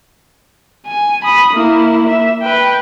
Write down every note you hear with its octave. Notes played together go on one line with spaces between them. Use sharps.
G#5
B5 D#6
A#3 E4
E5
B4 G5